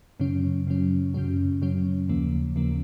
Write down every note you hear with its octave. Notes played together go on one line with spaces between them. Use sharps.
F#2 C#3 F#3 C#4
F#2 C#3 F#3 C#4
F#2 C#3 F#3 C#4
F#2 C#3 F#3 C#4
D#2 C#3 F3 A#3
D#2 C#3 F3 A#3